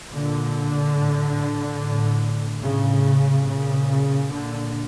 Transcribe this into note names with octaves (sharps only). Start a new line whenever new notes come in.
A#2 D3
A2
A2
A2 C#3
A#2 C#3
A#2 D3